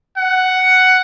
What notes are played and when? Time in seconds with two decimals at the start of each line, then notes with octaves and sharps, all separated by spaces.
0.17 F#5